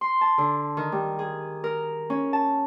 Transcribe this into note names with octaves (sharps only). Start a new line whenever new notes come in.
C6
A5
D3
D#3
G3
G#4
A#4
C#4
A5